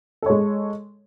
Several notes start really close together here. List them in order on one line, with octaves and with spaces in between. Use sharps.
A4 C#5 G#3